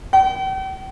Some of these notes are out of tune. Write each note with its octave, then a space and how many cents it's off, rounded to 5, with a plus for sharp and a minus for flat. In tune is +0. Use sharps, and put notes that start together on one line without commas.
G5 -40